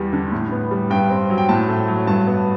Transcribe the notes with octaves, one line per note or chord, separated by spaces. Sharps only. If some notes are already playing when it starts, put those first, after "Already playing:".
Already playing: E2 G3
D3
A2
B3
G3
G2 G5
C4
F#3
G5
A2 A5
A3
F#3
G2 A5
B3